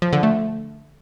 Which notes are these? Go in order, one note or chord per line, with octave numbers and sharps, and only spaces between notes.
F3
D3
A3